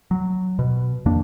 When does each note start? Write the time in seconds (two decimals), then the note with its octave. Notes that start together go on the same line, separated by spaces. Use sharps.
0.11 F#3
0.59 B2
1.06 F2 D#3 A#3 D4